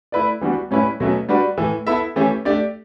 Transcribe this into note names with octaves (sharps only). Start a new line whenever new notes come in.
A3 E4 B4 D5
E3 G3 B3 D4 F#4
A2 G3 C#4 E4 B4
B2 F#3 A3 C#4
G3 D4 F#4 B4
A2 E3 A3
B3 E4 A4 E5
E3 A3 C#4 G4
A3 D4 G4 D5